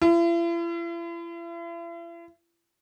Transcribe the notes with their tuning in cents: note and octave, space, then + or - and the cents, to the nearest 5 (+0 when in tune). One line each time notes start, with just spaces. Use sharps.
E4 +45